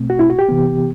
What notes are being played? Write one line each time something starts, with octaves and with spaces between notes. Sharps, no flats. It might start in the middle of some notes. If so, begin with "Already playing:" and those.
Already playing: B2 A3 C4
F#4
E4
F#4
G4
C3 E3 B3